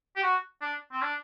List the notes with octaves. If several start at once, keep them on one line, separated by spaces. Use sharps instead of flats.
G4
F#4
D4
C4
D4